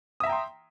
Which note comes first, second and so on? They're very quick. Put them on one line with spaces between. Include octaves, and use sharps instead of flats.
D#6 E5 A#5 G5 C6